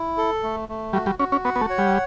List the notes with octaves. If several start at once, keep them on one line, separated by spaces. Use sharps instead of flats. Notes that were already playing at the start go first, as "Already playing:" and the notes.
Already playing: E4
A4
A3
A3
G3 F#4
G3
C#4 F#4
C#4
B3 F#5
B3
A3
C#5
G3